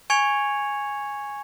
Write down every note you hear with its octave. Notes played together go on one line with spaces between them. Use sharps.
G#5 C#6 G#6 C#7 F7